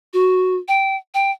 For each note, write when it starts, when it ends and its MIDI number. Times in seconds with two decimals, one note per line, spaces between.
0.13 0.56 66
0.68 0.96 79
1.14 1.31 79